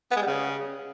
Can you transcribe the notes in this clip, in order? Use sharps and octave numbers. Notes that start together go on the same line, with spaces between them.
B3
G#3
G3
C#3